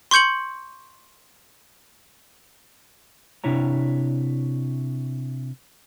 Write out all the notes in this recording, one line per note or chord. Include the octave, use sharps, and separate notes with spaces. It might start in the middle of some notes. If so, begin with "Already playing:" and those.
C6 C#6 G6 C#7 F#7
C3 D4 E4 C#5 A#5